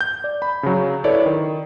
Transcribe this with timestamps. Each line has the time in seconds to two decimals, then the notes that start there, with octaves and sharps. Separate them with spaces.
0.01 G6
0.24 D5
0.42 B5
0.63 C#3 F#3
1.04 E4 A4 B4 C#5 D5 E5
1.26 D#3